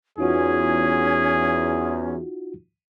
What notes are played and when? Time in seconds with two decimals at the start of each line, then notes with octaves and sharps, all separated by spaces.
0.18 E2 C#4 D#4 F4 F#4 G#4